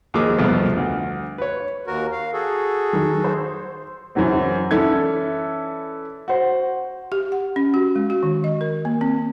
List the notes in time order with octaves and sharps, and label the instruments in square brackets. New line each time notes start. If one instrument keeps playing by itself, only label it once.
[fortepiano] D#2 F3 A#3 G#4 D6
C2 F2 B2 F3 A3 B3
D2
B4 C#5
[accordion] D#2 F#4 A#4
F5
F#4 G#4 A4
[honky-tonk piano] D#3 F#3
C5
[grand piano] F#2 C#3 E3 F#3 C4
E3 C#4 E4 A4 D5 G#6
F#4 C5
[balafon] G4
F#5
C#4
F#4
G#3
F#4
D#3
D#5
A#4
A#3
C4